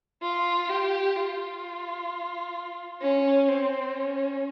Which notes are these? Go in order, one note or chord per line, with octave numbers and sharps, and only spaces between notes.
F4
G4
F4
C#4
C4
C#4